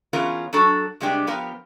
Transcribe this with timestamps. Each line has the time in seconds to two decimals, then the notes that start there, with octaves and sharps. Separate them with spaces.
0.13 E3 B3 C#4 F4 G#4 A#4
0.53 F#3 D4 F#4 A4
1.00 C3 G3 G#3 B3 D4 G4
1.27 F3 B3 G4 A#4 F5